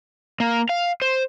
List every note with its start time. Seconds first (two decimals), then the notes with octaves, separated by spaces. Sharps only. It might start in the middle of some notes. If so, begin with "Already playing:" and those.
0.40 A#3
0.69 F5
1.02 C5